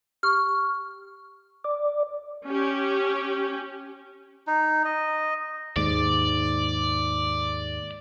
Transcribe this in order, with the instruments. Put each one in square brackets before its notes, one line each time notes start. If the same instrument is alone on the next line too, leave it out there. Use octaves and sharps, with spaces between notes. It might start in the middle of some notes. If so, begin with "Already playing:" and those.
[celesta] G4 C#6 [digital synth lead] F6
[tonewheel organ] D5
[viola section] C#4 G4
[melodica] D#4
D#5
[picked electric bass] D#2 G#2 [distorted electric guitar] D5